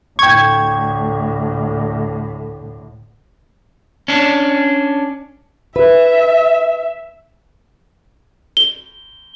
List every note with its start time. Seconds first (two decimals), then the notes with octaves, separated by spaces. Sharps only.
0.19 D2 A2 G5 C#6 G#6
4.08 C#4 D4
5.76 B4 E5
8.57 G7